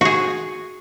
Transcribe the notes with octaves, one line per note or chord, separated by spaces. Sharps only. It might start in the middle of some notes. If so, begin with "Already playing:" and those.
F#4 G#4